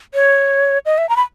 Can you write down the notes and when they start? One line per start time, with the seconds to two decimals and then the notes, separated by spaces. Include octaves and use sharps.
0.14 C#5
0.86 D#5
0.98 E5
1.09 A#5
1.17 B5